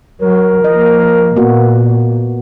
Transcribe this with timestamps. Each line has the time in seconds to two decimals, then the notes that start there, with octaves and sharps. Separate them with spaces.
0.22 F#3 A#4
0.64 F3 A#3 D#5
1.36 A#2 A#3 B3 F#4